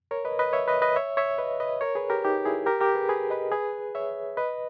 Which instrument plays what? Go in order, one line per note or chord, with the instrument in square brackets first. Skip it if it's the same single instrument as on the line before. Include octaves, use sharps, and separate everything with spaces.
[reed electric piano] A#4 C#5
B4 D#5
B4 D#5
C#5 E5
B4 D#5
B4 D#5
C#5 E5
C#5 E5
B4 D#5
B4 D#5
A#4 C#5
G#4 B4
G4 A#4
D#4 G4
E4 G#4
G4 A#4
G4 A#4
G#4 B4
G#4 B4
B4 D#5
G#4 B4
C#5 E5
B4 D#5